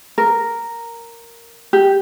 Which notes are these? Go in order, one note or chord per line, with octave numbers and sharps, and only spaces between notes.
A#4
G4